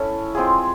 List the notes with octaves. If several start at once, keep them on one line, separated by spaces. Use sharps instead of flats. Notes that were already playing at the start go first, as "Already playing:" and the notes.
Already playing: C#4 E4 A4 C#5
G#3 C4 F4 G#4